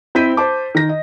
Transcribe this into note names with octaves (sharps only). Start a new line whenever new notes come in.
C4 E4 G6 B6 D#7
C5 A5 D6
D#3 A#6
D#5